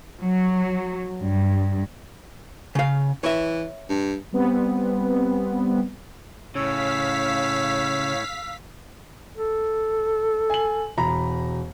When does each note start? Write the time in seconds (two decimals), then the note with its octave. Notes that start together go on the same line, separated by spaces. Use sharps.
0.22 F#3
1.20 G2
2.75 C#3 F5
3.23 E3 C#5 E5
3.89 G2
4.33 G3 B3 C4
6.55 A2 C#3 C#5 F5 E6 B6
9.36 A4
10.50 G#5 F#7
10.97 E1 A#5 B5